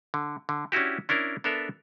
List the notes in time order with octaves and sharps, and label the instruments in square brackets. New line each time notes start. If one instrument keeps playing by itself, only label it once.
[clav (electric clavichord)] D3
D3
C#4 D4 E4 F#4 G4
C#4 D4 E4 A#4
B3 D4 A4 A#4 E5